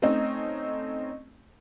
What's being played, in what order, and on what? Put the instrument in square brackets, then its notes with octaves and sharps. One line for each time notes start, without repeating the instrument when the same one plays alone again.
[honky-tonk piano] A3 C4 C#4 D#4